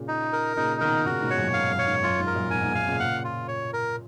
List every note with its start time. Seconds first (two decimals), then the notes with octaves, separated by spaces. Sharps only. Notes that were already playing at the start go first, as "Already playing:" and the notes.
Already playing: A#2 C#3
0.08 D#4
0.33 A#4
0.57 A#2 C#3 D#4
0.81 B2 D#3 A#4
1.06 A#2 C#3 F#4
1.21 G#2 B2
1.30 C#5
1.38 F#2 A#2
1.53 G#2 F5
1.70 F#2
1.79 C#5
1.87 G#2
2.03 F#2 F4
2.19 G#2
2.27 A#4
2.34 F#2 A#2
2.51 G#2 B2 G#5
2.63 G#2 B2
2.75 G#2 B2 F5
2.87 A#2 C#3
3.00 A#2 C#3 F#5
3.24 F4
3.48 C#5
3.73 A#4